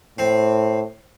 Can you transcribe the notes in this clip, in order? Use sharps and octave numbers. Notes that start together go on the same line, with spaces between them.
A2 C4